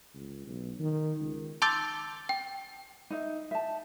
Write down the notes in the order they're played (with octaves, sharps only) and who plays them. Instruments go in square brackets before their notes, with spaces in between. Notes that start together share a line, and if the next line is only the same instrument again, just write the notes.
[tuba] C#2
B1
D#3
C#2
[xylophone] A5 C6 D6 E6 G6 A6
G5
[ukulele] D#4 E5
E5 A5